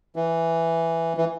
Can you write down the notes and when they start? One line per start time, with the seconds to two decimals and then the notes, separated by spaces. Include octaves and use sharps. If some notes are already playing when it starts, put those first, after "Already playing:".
0.16 E3
1.17 E3